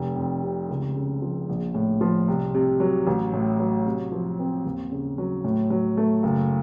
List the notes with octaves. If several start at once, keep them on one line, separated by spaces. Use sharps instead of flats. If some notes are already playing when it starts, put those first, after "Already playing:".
Already playing: F1
F2
C3
C#2
C#3
F3
A#1
A2
F3
C2
C3
F#3
A1
A2
F#3
C3
F3
C4
D#2
C#3
F#3
A2
F#3
A3
F#1